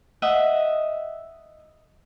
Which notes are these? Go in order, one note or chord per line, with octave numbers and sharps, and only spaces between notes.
D#5 E5 F#5